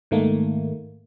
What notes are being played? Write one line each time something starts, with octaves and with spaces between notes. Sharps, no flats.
G#2 D#3 A3 A#3